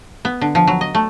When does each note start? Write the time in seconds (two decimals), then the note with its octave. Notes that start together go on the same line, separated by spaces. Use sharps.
0.25 B3
0.41 D3
0.55 F3
0.67 F#3
0.81 D#5
0.95 A3